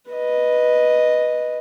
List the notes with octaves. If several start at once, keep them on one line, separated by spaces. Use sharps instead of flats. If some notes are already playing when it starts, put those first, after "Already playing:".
B4 D#5